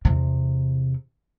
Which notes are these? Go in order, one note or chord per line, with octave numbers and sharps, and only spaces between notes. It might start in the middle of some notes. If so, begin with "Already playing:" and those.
E2 C3